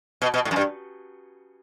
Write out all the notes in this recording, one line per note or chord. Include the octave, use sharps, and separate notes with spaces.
B2
B2
A2
F#2
G2